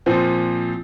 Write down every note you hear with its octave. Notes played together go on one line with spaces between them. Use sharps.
A#2 F3 C4